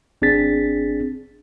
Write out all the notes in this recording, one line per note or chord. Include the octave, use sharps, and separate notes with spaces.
G#1 C4 D4 G#4 A6 B6